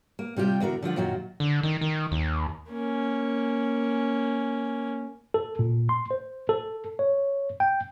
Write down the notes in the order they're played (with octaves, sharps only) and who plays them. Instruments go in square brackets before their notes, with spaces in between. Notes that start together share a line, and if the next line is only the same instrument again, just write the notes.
[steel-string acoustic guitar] A#3
C3 G3 F4 G4
E2 D3 F#4 A#4
D3 F3 F4 F#5
F#2 A#2 D#3 F#3 F4 F#4
[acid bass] D3
D#3
D#3
D#2
[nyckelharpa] A#3 C#4
[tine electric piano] A4
A#2
C6
C5
A4
C#5
G5